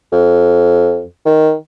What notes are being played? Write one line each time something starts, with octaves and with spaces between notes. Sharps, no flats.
F2
D#3